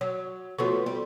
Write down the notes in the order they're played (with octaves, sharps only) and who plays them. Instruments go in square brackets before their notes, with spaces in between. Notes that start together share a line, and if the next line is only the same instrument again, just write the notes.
[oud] F#3 [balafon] C#5
[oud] F3 A3 B3 [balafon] F#4 C#5 C#6
[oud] G3